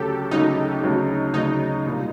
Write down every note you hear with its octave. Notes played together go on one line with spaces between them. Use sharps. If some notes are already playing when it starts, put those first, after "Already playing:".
Already playing: D2 C#3 F#3 G4 A4
D2 C#3 F#3 D#4
D2 C#3 F#3
D2 C#3 F#3 D#4
C2 A#2 G3